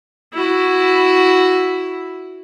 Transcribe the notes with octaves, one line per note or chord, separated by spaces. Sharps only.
E4 F#4